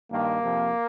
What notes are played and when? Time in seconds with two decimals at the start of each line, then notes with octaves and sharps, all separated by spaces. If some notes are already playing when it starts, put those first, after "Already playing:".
0.10 G2 D#3 A#3
0.41 F2 C3 F3